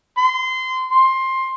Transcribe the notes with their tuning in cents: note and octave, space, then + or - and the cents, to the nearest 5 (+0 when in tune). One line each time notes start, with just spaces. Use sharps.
C6 -20
C6 +15